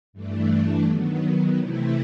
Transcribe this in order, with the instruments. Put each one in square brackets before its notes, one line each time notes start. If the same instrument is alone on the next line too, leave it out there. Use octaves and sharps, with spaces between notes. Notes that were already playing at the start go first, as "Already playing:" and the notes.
[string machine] G2 E3 A3 D4
D#3 F#3 B3
C3 E3 A3 C4 E4